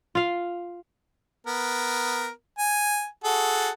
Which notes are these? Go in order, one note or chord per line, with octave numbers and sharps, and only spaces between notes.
F4 F5
B3 A#4
G#5
F#4 G#4 A4